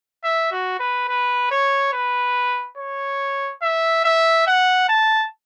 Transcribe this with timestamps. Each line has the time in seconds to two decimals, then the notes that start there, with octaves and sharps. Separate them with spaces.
0.24 E5
0.52 F#4
0.80 B4
1.08 B4
1.51 C#5
1.93 B4
2.77 C#5
3.63 E5
4.05 E5
4.47 F#5
4.89 A5